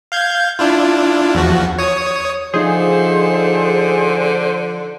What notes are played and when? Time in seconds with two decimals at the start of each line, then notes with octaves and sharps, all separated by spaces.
0.12 F5 G6 G#6
0.59 D4 E4 F4
1.35 E2 F3 F#4
1.78 C#5 D#6
2.54 D3 F3 D#4 F4 G#4 C5